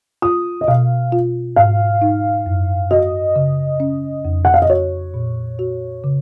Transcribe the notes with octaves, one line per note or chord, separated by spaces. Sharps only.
F4 D#6
D#5
B2 F5
F4
G#2 F5
D#4
F#2
F#4 D#5
C#3
C#4
F2
F#5
F5
D#5
F#4 C#5
A#2
F#4
C#3